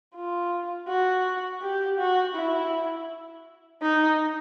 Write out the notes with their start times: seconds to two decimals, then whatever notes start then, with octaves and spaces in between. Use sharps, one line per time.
0.15 F4
0.89 F#4
1.62 G4
1.99 F#4
2.36 E4
3.82 D#4